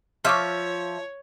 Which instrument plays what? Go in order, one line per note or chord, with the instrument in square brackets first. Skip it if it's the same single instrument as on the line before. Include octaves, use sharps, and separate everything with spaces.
[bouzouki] F3 E5 [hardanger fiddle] C#5 [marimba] C#6 D6 F6